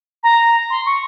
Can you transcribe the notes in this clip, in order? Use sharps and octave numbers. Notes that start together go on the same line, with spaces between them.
A#5
C6
C#6